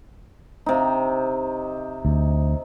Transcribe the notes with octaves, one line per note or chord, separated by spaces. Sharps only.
C3 D#4
D2